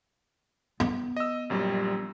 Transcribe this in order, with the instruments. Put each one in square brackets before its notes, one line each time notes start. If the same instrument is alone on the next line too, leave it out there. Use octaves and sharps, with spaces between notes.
[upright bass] B3
[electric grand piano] D#5 E6
A#1 F#2 G3